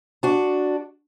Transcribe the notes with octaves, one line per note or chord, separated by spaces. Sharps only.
D4 F#4